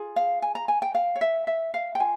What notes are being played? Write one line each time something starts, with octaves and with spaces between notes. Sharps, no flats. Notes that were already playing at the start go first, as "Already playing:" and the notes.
Already playing: F4 G#4
F5
G#5
A#5
G#5
G5
F5
C#5
E5
E5
F5
G5
F4 G#5